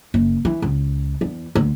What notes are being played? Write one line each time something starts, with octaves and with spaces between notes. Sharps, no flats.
F#1
E3
C#2
E2
D2